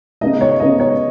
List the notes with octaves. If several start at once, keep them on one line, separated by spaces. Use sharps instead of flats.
C#3 B3 D#4 D#5
C#5
C#3 B3 D#4 D#5
C#5